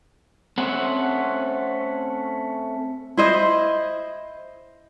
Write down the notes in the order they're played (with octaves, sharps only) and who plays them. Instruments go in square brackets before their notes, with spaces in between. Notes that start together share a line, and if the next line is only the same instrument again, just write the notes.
[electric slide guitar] A3 C4 C#4 F#5
[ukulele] E4 C5 D#5